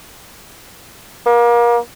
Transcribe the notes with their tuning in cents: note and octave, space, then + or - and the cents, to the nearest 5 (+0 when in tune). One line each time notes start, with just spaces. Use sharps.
A#3 +30